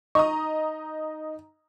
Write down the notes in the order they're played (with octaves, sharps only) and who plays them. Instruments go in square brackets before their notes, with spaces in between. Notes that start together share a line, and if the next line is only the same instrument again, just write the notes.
[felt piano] D#4 [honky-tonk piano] D#5 A#5 D#6 [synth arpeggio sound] C#6